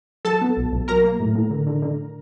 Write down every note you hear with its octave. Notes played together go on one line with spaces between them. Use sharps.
F#3 A4 A5
B3
B1
B1
F#3 A#4 A#5
A#3
A2
A2
D3
D3
D3